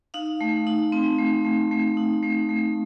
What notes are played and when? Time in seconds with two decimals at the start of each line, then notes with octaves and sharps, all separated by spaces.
0.14 D#4 F5
0.41 A3
0.67 D#4
0.92 C4
1.18 A3
1.45 A3
1.71 A3
1.97 D#4
2.23 A3
2.49 A3